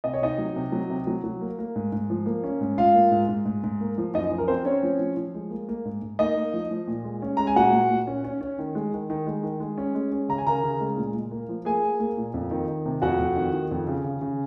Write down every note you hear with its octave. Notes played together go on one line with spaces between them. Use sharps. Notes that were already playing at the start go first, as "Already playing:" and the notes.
C3 D#5
C#5
C3 D#4 D#5
F#3
C3
F#3
C3
F#3
F#3
A#3
A#3
G#2
G#2
F3
A#3
C#4
G#2
G#2 F4 F5
A#3
G#2
G#2
G#2
G#2
A#3
F3
F#2 D#4 D#5
F3
A#4
C4 C5
C4 C#4 C#5
F3
F3
F3
G#3
A#3
A#3
G#2
G#2
A#3 D#4 D#5
A#3
F3
F3
A#2
G#3
C#4
G#3 A#5
G#5
A#2 F#4 F#5
A#2
A#2
C#4
C#4
C#4
D#3
G#3
D#3
D#3
G#3
D#3
G#3
C#4
G#3
C#4
C#3 A#5
G#5
C#3 A#4 A#5
C#3
G#3
A#2
A#2
A#3
F3
A#3 G#4 G#5
A#3
A#3
A#2
F2
D#3
D#3
C3
F2 F#4 F#5
F2
D#3
D#3
F2
C#3
C#3
C#3